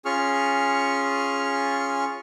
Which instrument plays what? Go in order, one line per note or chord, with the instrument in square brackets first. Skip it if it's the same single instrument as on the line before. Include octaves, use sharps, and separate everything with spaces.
[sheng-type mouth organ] C#4 F4 G#4 C#6 F6